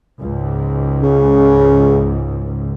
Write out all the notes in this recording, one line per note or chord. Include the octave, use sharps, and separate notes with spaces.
C#2 G#2
C#3